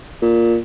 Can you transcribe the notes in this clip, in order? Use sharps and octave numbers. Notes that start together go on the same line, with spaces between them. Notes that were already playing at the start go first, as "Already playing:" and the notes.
A#2